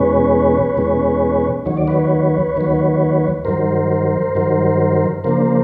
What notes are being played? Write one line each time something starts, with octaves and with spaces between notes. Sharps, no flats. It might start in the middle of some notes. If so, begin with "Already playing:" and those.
Already playing: E2 B2 G#3 C#4 B4 C#5
E2 B2 G#3 C#4
D#2 D#3 F#3 C#5
D5
B4 C#5
D#2 D#3 F#3
G2 D#3 F#3 A#4 C5
G2 D#3 F#3
C#3 F3 A#3 D4 A#4 C5